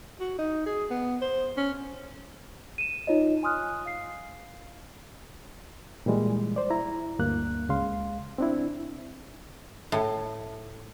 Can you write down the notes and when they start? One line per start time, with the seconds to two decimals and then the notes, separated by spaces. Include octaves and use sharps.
0.20 F#4
0.39 D#4
0.66 G#4
0.90 B3
1.21 C5
1.57 C#4
2.78 D#7 E7
3.07 D#4 F4 C#5 D#5
3.43 G#5 C6 D#6 F6 F#6
3.85 F5 C7
6.06 A#2 E3 G3 G#3
6.56 C5 D5
6.70 E4 A#5
7.19 D2 G2 A#3 F#6
7.69 C#2 C#3 G#3 F5 C6
8.38 C4 D4 E4
9.92 A2